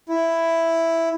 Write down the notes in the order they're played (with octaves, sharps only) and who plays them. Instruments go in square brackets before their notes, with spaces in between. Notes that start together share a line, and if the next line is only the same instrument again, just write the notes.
[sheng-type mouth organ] E4